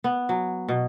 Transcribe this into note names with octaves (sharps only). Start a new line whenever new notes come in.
B3
F#3
B2